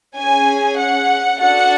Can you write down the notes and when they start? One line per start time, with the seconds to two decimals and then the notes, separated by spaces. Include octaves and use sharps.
0.17 C#4 G#4 G#5
0.80 F#5
1.41 D4 F#4 A4 F#5